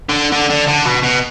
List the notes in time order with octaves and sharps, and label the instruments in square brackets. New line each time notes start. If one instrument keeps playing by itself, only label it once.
[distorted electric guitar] D3
D3
D3
D3
B2
B2